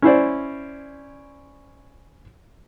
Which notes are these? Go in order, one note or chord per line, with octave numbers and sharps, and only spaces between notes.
C#4 E4 C5 D5